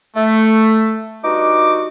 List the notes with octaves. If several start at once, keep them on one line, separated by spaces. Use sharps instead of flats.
A3
G2 D#4 F#4 D6